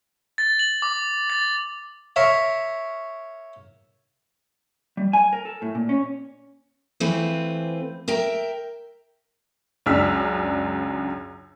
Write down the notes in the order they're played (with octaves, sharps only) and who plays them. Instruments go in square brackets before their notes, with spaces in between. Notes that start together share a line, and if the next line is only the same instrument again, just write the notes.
[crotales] A6
F#7
D6
A6
[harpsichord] A#4 C#5 E5 F5
[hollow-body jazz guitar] G3
G#5
A#4
A4
A2
A#2
C#4
[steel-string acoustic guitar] E3 A3 C4 F4 B4
A#4 E5 G5
[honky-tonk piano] C#2 F#2 D4 E6 F6 B6